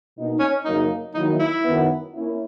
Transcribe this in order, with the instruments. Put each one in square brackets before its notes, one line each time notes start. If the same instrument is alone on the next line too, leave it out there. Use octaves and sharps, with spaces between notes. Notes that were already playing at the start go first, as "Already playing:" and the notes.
[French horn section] B2 A#3 D#4
[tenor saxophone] C#4
[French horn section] F#2 C#3 F#3 A#3 [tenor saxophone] D#4
[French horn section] D#3 F#3 A#3 E4 [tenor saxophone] D#4
[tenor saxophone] E4
[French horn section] F#2 D#3 F#3 B3
A#3 C#4 E4